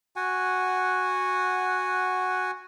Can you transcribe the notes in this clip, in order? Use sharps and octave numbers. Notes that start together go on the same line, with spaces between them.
F#4 F#5 G#5